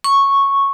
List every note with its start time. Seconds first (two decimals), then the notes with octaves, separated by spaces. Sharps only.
0.04 C#6